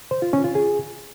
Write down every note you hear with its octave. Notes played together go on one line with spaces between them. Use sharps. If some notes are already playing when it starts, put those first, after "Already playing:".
C5
F4
C#4
F4
G#4